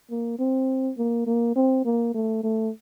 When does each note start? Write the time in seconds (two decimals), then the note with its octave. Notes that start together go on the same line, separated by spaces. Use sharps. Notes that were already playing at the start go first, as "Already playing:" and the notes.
0.11 A#3
0.39 C4
0.98 A#3
1.27 A#3
1.56 C4
1.85 A#3
2.15 A3
2.44 A3